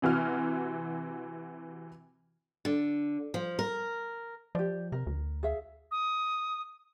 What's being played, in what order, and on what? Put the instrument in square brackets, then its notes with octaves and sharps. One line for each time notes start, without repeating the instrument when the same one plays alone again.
[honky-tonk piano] C3 E3 F#4 F6
[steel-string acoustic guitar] D3
F3
A#4
[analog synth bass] F3 [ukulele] G4 D5
[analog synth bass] C3 [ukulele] A#4
[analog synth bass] D2
[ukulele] G#4 E5 F5
[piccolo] D#6